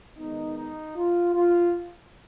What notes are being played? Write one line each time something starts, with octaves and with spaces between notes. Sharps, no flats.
D#3 G#3 B3 D#4
D#4
F4
F4